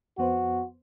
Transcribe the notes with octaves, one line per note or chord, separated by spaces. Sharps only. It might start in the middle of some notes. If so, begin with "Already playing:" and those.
F2 B3 F#4 C5